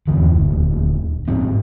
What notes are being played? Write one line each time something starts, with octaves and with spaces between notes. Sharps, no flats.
E2 G2 D3 E3
D#1 D2
G#2 F3 C4